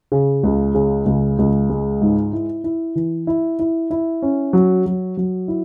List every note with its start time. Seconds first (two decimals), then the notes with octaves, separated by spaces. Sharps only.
0.12 C#3
0.43 C#2
0.74 C#3
1.06 C#2
1.39 C#2
1.70 G#3
2.02 G#2
2.33 E4
2.64 E4
2.95 E3
3.27 E4
3.59 E4
3.91 E4
4.22 C#4
4.53 F#3
4.86 F#3
5.17 F#3
5.48 E4